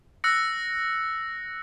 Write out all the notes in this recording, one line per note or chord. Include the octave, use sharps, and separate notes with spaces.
E6 F#6 A#6 C#7